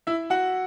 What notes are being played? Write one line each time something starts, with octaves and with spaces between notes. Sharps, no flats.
E4 E5
F#4 F#5